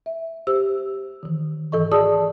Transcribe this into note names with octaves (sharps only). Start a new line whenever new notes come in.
E5
G4 C5 E6
D#3 E3
G#2 E3 A4 D#5 C#6
F#4 G#4 D5 A5 D#6 E6